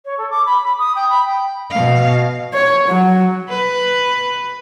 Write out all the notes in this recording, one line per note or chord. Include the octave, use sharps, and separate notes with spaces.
C#5
A4
D6
B5
B5
D#6
G5
B5
G5
B2 F5
C#5
F#3
B4